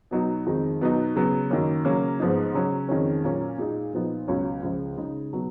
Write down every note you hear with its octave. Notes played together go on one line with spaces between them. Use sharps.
B2 F#3 B3 D#4
F2 D#3 G#3 D#4
B2 F#3 B3 D#4
C#3 F#3 B3
F#2 D#3 A#3 C#4
C#3 F#3 A#3 C#4
G#2 F3 B3 D#4
C#3 F#3 C#4
F2 D#3 G#3 C#4
A#2 F#3 A#3 C#4
A#2 G#3 D#4
A#2 F3 B3 D#4
C#2 B2 F#3 C#4
C#2 C#3 F3 G#3
C#3 G#3 D#4
B2 F#3 B3